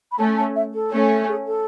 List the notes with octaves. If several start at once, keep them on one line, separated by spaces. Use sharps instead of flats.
B5
A3 C#4 A5
A5
E5
A4
A3 C#4
G#4
A4